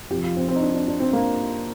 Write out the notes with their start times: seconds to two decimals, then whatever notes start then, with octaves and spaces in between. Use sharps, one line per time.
0.10 F2 C3 F3 G4
0.23 F4
0.37 C4
0.48 C4
0.56 D#4
0.62 D4
0.74 D4
0.88 D4
1.00 C4
1.13 A#3